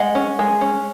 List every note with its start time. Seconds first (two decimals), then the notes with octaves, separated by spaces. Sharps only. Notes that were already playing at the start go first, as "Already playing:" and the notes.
Already playing: G#3 D#5 F#5
0.15 C#4
0.39 G#3
0.61 C#4